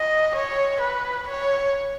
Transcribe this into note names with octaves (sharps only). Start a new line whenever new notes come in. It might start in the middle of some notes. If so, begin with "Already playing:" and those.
Already playing: D#5
C#5
B4
C#5